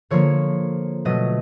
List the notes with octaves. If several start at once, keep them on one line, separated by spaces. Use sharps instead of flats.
D3 F3 A#3 C#5
B2 F#3 A3 D#5